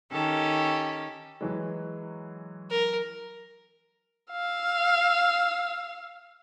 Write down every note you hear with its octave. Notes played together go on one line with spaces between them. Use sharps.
D#3 C#4 G4 A4
E3 F#3 G#3
A#4
F5 E6